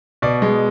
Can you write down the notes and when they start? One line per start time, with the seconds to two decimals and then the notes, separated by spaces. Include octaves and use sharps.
0.22 B2 D5
0.42 G#3